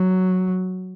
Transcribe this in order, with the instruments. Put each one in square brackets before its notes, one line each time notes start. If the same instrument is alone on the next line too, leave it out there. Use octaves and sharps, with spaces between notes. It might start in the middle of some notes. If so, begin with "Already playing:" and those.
Already playing: [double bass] F#3